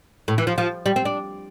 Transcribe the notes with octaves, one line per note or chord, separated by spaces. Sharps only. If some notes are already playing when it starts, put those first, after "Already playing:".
A2
E3
F3
F3
G3
C4
D4